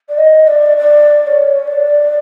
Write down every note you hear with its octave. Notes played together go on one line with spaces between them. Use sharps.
D5
D#5
D5
D5
D5
C#5
D5